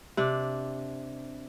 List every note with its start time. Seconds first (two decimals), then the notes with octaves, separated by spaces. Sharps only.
0.17 C3 D4